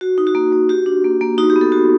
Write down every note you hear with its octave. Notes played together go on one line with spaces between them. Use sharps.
F#4
D#4
F#4
A#3
A#3
F#4 G4
D4
A#3
A#3
D#4 F#4
G4
B3
A4
F#4